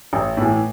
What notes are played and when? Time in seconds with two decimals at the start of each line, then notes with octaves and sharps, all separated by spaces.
0.13 A1
0.37 A2 E3